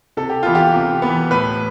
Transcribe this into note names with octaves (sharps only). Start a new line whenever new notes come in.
C3 A4
G4
E3 B3 F4
G4
C3
E3 B3
A2 B4